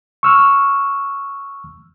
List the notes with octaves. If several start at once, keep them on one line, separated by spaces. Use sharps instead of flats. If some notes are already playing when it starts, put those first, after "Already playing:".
C#6 E6 F6